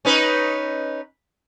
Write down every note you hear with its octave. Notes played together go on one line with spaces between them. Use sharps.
C#4 D#4 B4